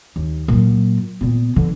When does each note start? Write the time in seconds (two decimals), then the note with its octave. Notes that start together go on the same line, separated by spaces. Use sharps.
0.16 D#2
0.48 A#2 F#3
1.21 A#2 B3
1.56 D3 E3